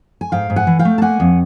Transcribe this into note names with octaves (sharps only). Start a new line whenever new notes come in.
G#5
G#2 F5 G5
G#2
F#5 G#5
E3
F5 G5
A3
A5
A#3 F#5 G#5
F2